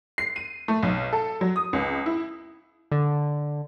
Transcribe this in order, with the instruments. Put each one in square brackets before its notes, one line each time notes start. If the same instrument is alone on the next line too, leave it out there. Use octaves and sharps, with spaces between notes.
[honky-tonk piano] C7
D#7
A3
B1
A4
F#3
D#6
C#2
E4
[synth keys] D3